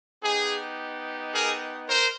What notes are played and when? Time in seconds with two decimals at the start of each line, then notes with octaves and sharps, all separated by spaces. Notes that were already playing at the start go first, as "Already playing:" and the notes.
0.22 B3 D#4 G4 G#4
1.33 G#4 A#4
1.88 A#4 C5